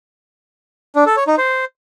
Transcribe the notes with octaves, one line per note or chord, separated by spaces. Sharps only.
D4
A4
C#5
D#4
C5